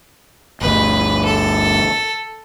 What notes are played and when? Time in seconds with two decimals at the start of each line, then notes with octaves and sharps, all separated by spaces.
0.61 G1 D2 B4
1.25 A4